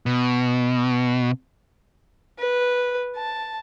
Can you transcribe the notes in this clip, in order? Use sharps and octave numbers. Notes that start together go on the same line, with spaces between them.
B2
B4
A5